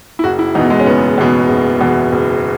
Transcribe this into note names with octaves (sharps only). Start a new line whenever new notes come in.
E4
F#1 F#4
E4
E2 B2 D#4
G#3
C#4
F#1 B3
E2 B2
F#1
E2 B2
F#1